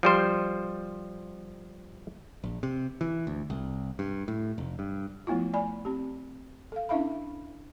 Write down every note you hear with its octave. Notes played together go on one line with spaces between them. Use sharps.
F3 G3 C5
A#1
C3
E3
D2
C2
G2
A2
F1
G2
F3 A3 B3 E4 F4
A3 D5 G#5 B5
C4 G4
A4 F5
C#4 D4 E4 E5 F5 B5